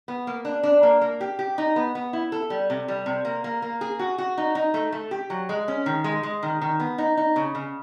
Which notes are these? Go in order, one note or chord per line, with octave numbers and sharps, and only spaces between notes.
B3
A#3
D4
D4
A#3
A#3
G4
G4
D#4
B3
B3
E4
A4
G3
C3
G3
C3
A#3
A#3
A#3
G#4
F#4
F#4
D#4
D#4
A3
A3
G4
F#3
G#3
C#4
D#3
G#3
G#3
D#3
D#3
B3
D#4
D#4
C#3
C#3